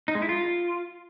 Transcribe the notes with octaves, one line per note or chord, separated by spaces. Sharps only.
D#4
G#3
E4
F4